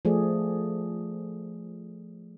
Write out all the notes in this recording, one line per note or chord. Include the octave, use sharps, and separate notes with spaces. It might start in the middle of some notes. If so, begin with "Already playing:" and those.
F3 A3 G#4 D5